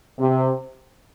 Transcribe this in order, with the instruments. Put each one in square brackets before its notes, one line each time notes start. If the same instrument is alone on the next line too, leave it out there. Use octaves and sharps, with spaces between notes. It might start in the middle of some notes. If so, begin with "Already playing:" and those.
[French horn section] C3